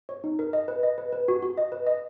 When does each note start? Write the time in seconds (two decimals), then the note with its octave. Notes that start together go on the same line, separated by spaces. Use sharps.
0.09 C#5
0.24 D#4
0.39 A#4
0.53 D#5
0.68 B4
0.83 D#5
0.98 B4
1.12 B4
1.28 F#4
1.42 F#4
1.58 D#5
1.72 B4
1.87 D#5